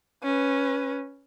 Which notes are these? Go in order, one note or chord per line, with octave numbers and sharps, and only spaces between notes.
C#4 B4